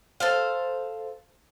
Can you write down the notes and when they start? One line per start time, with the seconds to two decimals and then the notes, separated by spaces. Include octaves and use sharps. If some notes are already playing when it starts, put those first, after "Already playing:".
0.20 A4 C5 F5